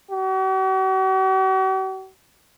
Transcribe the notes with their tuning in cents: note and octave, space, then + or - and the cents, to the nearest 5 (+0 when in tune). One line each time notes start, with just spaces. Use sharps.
F#4 +45